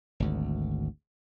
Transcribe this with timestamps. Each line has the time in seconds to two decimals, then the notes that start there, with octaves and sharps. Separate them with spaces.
0.20 G#1 D2